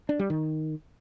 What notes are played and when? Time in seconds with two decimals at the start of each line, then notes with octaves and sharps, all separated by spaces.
0.09 D4
0.19 G3
0.30 D#3